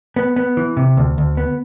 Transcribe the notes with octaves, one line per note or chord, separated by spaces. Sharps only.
B3
B3
E3
C3
D2
D2
B3